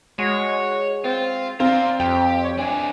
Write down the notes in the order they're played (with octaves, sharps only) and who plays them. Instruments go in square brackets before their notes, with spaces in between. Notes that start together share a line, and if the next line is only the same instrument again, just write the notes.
[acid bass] G#3 [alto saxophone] F#4 [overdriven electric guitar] C#5
[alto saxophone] C4 [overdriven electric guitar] F4
[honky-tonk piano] C4 [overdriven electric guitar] D5 A#5 [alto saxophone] F5
[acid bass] F2 [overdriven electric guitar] G4 [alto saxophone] G5
[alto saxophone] C#5
[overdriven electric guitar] E3 D4 [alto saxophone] G#5